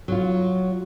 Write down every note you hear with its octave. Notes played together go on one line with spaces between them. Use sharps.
F#3 F4